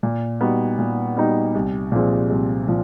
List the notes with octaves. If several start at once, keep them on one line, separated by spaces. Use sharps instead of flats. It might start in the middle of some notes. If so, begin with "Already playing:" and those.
A#2
G3 B3 D#4 F#4
A#2
G3 B3 D#4 F#4
C2
A#2 F3 G#3 C4
C2
A#2 F3